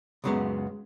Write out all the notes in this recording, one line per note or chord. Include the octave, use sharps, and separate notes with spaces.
C#2 F#2 C#3 F#3 G#3 B3